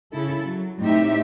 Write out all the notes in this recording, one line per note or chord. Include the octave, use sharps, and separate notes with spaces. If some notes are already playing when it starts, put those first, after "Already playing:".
C#3 E4 A4
F#3
A2 C4 D#4 G4 E5